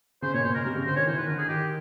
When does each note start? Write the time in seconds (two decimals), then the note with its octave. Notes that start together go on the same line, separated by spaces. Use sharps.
0.22 C#3 C5
0.33 A#2 C#5
0.39 B2
0.44 A#2 C5
0.54 B2 A#4
0.64 C3 A#4
0.75 C#3
0.85 D3 C5
0.96 D#3 C#5
1.07 E3 C5
1.17 D#3 B4
1.28 D3 A#4
1.38 G#4
1.48 D#3 G4